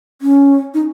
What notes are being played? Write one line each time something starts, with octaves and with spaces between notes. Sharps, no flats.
C#4
D#4